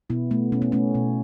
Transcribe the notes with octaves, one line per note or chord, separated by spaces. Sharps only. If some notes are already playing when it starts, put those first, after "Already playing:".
B2 B3 E4
A3 B3
B2 C#4
B3
A3 C#4
B2